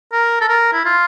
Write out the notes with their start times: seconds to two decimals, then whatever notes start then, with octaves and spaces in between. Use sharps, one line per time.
0.12 A#4
0.41 A4
0.48 A#4
0.73 E4
0.85 F4